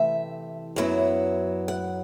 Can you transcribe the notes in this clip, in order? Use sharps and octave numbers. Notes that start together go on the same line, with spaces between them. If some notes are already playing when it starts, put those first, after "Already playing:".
Already playing: C3 E3 A3 E5
F#2 F#3 B3 E4
F#5